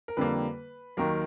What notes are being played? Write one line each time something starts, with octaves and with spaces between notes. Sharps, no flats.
A#4
F2 D3 G3 A#3 B4
D#2 D#3 F#3 A#3 A#4